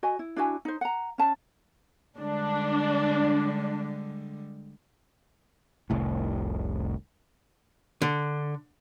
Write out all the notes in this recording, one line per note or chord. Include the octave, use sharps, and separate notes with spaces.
F#4 D#5 G#5
E4
D4 E4 F#4 G#5
D#4 C5
F#5 A#5
C#4 A5
D3 G3 G#3 D4
F1 C2 A2
D3